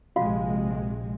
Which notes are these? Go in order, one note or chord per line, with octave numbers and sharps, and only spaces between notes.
A#1 C3 G#3 F4 F#4 F5